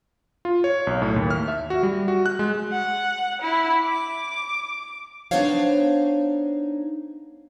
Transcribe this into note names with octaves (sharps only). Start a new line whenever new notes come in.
F4
C#5
B1
A2
D#2
F6
E5
F#4
G3
F#4
F#6
G#3
F#5
E4
D6
B3 D4 D#4 C5 C#5 F5